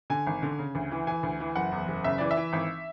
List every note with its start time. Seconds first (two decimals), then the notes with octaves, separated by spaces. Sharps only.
0.10 D3 G#5
0.27 G#1
0.42 D3
0.59 C#3
0.75 D2
0.91 E3
1.07 E3 G#5
1.23 D2
1.40 E3
1.56 F#1 F#5
1.72 E2
1.88 F#1
2.04 C#3 E5
2.18 E3 D5
2.31 E5
2.37 E3
2.53 G#1